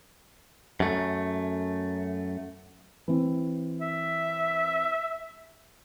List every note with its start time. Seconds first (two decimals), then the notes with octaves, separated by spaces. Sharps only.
0.80 F#2 A3
3.08 E3 C4
3.81 E5